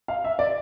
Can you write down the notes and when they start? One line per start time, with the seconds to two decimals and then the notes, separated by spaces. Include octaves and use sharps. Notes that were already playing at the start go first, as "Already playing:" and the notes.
0.08 F5
0.24 E5
0.39 D5